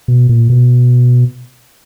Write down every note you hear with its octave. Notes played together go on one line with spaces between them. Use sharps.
B2
A#2
B2